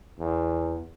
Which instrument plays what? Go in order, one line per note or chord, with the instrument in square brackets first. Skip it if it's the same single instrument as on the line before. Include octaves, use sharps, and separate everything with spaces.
[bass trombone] E2